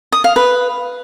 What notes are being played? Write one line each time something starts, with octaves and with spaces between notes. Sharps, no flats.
D#6
F5
B4